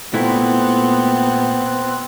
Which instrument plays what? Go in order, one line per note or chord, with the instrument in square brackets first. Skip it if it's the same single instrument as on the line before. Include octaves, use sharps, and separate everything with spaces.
[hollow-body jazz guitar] A#2 A3 E4 [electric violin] B3 [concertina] C4 F#6